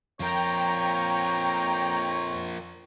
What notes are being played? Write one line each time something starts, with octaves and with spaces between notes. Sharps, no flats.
F2 F3 A#4 C#5 G5 A#5